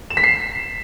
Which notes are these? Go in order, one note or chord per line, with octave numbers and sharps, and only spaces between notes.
E7
B6
C7